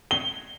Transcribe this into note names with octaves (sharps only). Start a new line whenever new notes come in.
G7